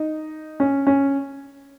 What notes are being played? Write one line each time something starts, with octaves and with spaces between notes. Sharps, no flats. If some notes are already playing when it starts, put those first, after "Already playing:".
Already playing: D#4
C#4
C#4